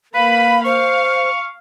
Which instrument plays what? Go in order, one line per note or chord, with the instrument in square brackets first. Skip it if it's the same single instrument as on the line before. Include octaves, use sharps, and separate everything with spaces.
[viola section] A#3 B5 [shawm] B4 [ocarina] F5
[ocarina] C5 [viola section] F5 [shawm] C#6